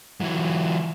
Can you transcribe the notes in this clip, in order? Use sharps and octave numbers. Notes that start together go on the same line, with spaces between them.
E3 F#3